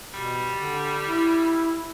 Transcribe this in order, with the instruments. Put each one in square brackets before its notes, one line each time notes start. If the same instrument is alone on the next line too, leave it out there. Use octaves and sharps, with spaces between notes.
[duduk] B2 [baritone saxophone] G3
[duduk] D3
E4